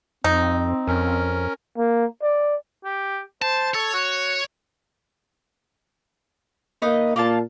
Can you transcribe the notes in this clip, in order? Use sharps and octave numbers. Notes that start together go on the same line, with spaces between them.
F2 C4 D#4
F2 C#4 A#4
A#3
D5
G4
C5 A5
A4 C#5
F#4
A#3 D#4 B4 D#5
A#2 A#3 F4 A5